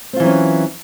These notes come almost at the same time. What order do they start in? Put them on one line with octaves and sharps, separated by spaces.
C4 F4 E3 F#3 C#4